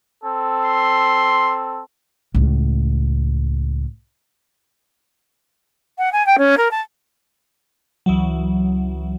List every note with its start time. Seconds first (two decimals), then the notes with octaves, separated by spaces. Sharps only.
0.24 C4 A4
0.65 C6
2.34 C#2 A2
5.98 F#5
6.12 G#5
6.26 G5
6.38 C#4
6.57 A#4
6.71 A5
8.06 C#2 E3 F#3